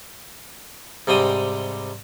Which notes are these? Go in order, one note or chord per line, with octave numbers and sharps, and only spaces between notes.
G#2 C3 G3 G5 D#6